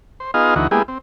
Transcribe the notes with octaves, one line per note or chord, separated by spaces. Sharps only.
C5
B3 D#4 F4 G#4 D#5 F5
D2 E3 D#4 F#4
G#3 A#3 B3 E4 G4 G#4
C4